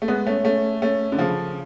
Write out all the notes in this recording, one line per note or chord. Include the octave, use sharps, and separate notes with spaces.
A3
G#3 B3
A3 C#4
A3 C#4
A3 C#4
D3
C#3 F3